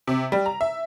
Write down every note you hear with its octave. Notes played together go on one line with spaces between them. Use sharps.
C3
G3
A#5
E5